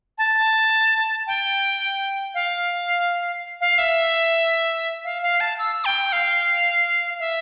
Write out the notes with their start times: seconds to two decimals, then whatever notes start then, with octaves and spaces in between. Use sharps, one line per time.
0.18 A5
1.27 G5
2.34 F5
3.61 F5
3.78 E5
5.04 F5
5.22 F5
5.40 A5
5.59 E6
5.85 G5
6.13 F5
7.20 E5